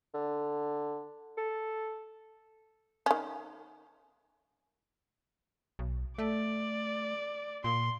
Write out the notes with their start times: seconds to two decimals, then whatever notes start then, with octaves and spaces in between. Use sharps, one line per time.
0.14 D3
1.38 A4
3.06 D#3 C#4
5.79 B1
6.19 A3 D5
7.64 A#2 C6